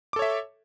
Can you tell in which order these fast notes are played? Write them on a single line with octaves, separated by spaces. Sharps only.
D6 A4 C#5 E5